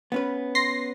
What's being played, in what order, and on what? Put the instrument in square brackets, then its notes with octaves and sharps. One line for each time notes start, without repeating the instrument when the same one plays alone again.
[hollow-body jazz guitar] B3 C#4 B4
[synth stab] C6 A#6 C7